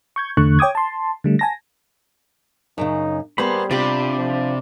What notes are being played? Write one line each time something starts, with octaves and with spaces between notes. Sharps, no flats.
C#6 G6 G#6
E2 D3 A3 C#6 F#6
C#5 G5 D6 D#6 G#6
A5 C6
D3 G3 A3
G#5 A5 A#6
F#2 A#2 C#3 D#4
G3 A#3 B3 G#4 C5 B5
C3 D4 F4 G4 D5 B5
F3